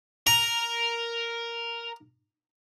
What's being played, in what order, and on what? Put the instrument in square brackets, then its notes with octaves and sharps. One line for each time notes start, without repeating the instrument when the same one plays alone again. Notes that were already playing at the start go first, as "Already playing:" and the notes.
[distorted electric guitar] A#4 [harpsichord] A#5